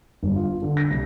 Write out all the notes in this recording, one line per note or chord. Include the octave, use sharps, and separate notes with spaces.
G1
F4
D3
A#6
C2